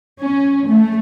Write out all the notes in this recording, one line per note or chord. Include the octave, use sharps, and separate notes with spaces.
C#4
A3